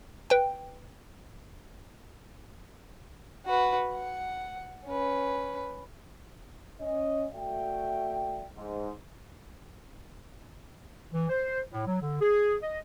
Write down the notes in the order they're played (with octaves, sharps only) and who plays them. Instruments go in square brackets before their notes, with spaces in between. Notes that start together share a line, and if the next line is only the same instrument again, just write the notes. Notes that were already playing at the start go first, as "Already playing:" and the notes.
[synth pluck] B4 G5
[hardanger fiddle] F#4 B4
F#5
C#4 B4
[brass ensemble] C#4 D#5
A3 F#4 D5 E5 G5
G#2
[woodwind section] E3
C5
A2
F#3
D3
G#4
D#5